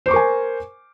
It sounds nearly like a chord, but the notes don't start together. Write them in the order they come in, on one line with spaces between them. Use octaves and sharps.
C5 D6 C#6 A#4 G#5